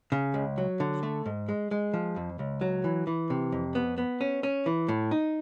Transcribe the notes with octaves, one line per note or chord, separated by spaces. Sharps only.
C#3
C#2
F#3
D3
A3
G#2
G#3
G#3
F3
F2
C#2
F#3
E3
E3
C3
F2
B3
B3
C#4
C#4
E3
A2
D#4